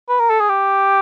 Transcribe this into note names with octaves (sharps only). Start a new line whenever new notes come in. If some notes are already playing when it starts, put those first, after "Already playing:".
B4
A#4
A4
G#4
G4